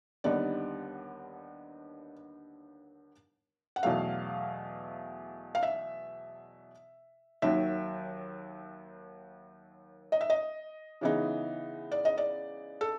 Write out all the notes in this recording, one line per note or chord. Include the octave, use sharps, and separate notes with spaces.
D#2 D3 G3 B3 D#4 D5
F#5
E2 B2 F#3 A3 F5
F5
E5
D#2 D#3 F#3 E5
D#5
E5
D#5
C#3 E3 G#3 B3 D#4
D5
D#5
D5
A4